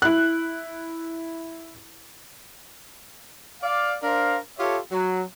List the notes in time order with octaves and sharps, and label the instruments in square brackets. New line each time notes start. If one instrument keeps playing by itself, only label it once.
[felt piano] E4 F#6
[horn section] D5 F5
D4 A#4 C5 F5
F4 G4 A4 C#5 E5
F#3